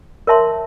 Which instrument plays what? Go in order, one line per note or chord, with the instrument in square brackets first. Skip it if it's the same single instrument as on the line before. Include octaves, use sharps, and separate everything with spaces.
[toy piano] A#4 C#5 E5 A5 C6